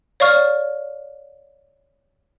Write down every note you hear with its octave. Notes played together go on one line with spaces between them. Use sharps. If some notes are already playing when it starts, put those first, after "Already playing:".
C#5 D5 F5 C#6 F6